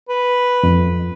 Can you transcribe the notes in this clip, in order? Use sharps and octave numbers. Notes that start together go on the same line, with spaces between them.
B4
F2